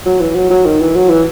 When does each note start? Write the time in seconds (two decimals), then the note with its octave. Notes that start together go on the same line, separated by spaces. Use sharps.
0.06 F#3
0.20 E3
0.35 F#3
0.50 F#3
0.65 D#3
0.80 E3
0.95 F#3
1.09 E3